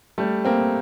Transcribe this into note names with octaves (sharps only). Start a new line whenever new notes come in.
G3 A3
A#3 C4